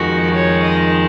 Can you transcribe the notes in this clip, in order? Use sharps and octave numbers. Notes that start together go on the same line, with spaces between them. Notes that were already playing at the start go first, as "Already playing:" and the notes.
Already playing: F2 D#3 G#3 F#4
C#5
D#5